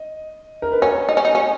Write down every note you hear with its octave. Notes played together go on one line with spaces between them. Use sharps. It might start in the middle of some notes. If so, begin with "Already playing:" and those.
Already playing: D#5
A#4
B4
C#4 C#5
D#4
C#4
D#4
C#4